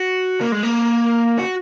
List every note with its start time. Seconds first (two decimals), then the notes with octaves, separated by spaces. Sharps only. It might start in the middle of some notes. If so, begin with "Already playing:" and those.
Already playing: F#4
0.41 A#3
0.52 G#3
0.63 A#3
1.39 F#4